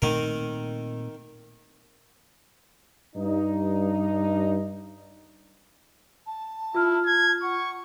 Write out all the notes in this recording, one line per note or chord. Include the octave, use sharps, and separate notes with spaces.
A#2 D#3 A3 C4 A#4
G2 D#4
A5
E4 F4 F6
G#6
F#5 C#6